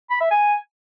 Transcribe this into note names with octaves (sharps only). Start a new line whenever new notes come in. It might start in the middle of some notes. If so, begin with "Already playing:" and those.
B5
E5
G#5